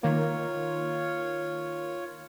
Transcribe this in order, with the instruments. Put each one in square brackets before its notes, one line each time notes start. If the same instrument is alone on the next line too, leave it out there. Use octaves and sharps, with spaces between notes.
[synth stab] D#3 A#3 [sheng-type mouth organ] F4 C#5